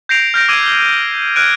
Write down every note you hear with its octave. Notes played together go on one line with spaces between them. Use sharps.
G6 A#6 C7 D7 F7
F6 G6 A#6 D7
D6 E6 G#6 D#7
G7
F6 F#6 G#6 D7 D#7